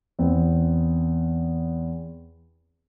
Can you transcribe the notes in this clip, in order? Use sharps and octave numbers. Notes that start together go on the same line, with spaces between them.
E2 C4